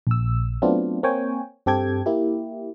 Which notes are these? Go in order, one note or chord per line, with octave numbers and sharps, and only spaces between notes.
A#1 E6
F#3 A3 B3 C4 D4 F4
A#3 C4 C#5 G5 G#5
G2 C4 G4 A4 G5 G#6
A#3 E4 G4